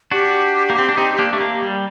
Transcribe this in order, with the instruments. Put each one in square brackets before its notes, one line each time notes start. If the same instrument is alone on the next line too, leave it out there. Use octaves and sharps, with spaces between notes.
[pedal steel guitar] D4 F#4 [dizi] G4
[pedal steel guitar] A#3
C4
D4
C4 D#4
A#3 D4
A3
A#3
G3